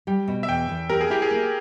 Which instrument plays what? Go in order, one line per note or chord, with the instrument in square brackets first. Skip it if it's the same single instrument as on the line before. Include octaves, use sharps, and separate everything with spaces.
[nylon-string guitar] G3 [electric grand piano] G5
[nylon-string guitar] B2
[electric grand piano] E5
[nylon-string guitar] E2 [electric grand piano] G5
[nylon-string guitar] E2
[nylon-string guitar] G4 [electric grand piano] A#4
[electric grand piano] G#4
[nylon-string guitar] E4 [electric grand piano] G4
[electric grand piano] G#4
[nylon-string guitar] A#3